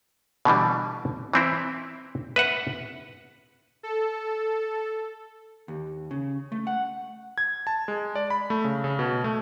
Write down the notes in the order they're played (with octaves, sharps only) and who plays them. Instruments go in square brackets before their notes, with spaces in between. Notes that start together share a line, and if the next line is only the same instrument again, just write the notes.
[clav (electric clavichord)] B2 D3 E3 G3
E3 C4 E4
B4 E5 F#5
[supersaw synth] A4
[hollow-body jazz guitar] D#2
C#3
A3
F#5
[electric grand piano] G#6
A5
G#3
D5
B5
A3
C#3
C#3
B2
A3